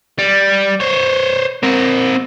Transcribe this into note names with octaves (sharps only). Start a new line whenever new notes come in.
G3
C5 C#5
C4 A#4